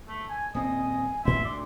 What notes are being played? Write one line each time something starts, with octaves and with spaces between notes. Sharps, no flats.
A3
G#5
D#1 C4 D#5 G#5
A1 A2 E5 C6
D2 D5